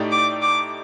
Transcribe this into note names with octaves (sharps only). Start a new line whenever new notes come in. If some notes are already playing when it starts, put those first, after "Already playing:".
Already playing: A2 A3 D#4 G4 D5
D6
D6